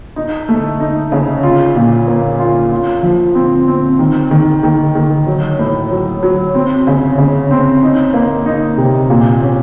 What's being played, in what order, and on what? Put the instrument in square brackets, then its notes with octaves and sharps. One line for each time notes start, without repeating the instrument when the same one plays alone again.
[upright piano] D#4
A3
D#4
C#3
F4
A#2
A#3
F4
F4
F3
C4
C4
D#3
D#3
D#3
D#3
F#3
A2
F#3
F#3
C4
C#3
C#3
C4
D#4
A#3
D#4
C3
A#2
C#4